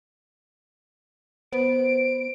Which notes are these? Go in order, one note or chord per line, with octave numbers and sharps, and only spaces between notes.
B3 C5 D7